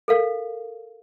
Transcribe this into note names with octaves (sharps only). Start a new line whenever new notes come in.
A4 A#4 F5